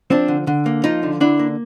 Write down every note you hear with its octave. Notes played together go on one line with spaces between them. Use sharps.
F3 C4 D4
D3
D3
A#3
F3 D#4 F4
D3
D3 D4 E4
A#3